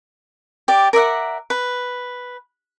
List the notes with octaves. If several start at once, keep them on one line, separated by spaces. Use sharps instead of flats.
G4 D5
A#4 D5 E5 F#5
B4